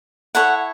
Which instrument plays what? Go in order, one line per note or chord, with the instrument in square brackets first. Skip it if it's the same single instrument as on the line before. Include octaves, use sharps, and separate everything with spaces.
[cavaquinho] E4 A4 C#5 F#5